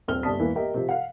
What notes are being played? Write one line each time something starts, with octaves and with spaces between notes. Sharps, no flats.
D#1 A#1 C4 F6 G7
G1 C3 D5 A5 D#6 B6
E1 E2 E3 A#3
G4 A#4 D#5 E5
C3 F3
F5 F#5